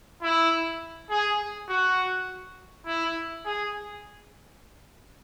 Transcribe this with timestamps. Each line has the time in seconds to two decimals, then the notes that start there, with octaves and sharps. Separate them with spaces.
0.22 E4
1.10 G#4
1.68 F#4
2.86 E4
3.45 G#4